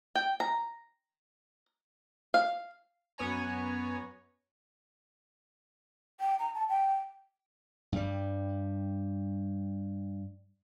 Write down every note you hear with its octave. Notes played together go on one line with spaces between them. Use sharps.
G5
A#5
F5
F#2 B3 B4 C#5 G#5 A#5
G5
A#5
A5
G5
G2 G3